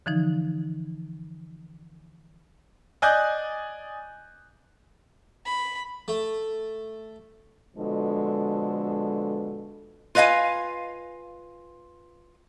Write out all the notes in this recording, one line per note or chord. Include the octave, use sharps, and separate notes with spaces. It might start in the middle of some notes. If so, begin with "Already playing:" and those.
D3 E3 F3 D#4
D5 D#5 G#5 D#6 F#6 G6
B5
A3
B2 D3 F3 G#3 A4
F4 B4 D#5 F5 G#5